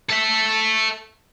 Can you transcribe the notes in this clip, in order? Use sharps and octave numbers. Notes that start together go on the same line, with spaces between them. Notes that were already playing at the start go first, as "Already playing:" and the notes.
A4 E5